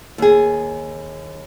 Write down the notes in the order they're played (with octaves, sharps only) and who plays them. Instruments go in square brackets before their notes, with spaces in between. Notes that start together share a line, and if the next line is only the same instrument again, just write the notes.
[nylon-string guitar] D#2 G#4